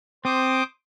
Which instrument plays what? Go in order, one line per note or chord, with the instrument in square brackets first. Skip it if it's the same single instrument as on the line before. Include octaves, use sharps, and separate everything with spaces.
[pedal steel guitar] C4 [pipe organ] C5 D6 D#6